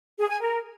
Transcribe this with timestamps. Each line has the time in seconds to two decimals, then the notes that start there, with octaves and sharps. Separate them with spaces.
0.18 G#4
0.30 G#5
0.41 A#4